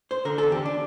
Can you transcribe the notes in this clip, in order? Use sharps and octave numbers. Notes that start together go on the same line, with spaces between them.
C5
D3 A#4
A4
E2
G4
D4